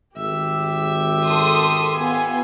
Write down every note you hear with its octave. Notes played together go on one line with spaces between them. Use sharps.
G#1 G4 E5
A4 C6 D#6
B3 F4 G#5